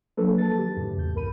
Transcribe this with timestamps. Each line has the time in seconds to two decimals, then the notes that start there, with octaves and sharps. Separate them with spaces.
0.17 F3 F#3 A#3 D4 A4 B4
0.38 A5 A6
0.58 D#3 G4
0.77 F#2 A2 C#3
0.97 E2 G6
1.14 C2 G2 A#4 B5 D#7